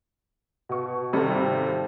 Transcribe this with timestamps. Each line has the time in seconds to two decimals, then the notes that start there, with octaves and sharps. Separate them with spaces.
0.69 B2 C#6
1.13 G#1 C3 G3 A4